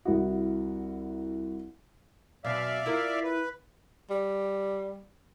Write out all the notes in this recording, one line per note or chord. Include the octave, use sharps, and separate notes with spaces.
C2 E4 F#4
F#2 B2 D5 E5 F5
E4 F4 A#4
B4
G3